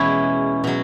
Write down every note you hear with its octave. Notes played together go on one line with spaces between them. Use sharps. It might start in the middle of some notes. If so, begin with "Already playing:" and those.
Already playing: E2 B2 G#3 C#4 E4
B2 F#3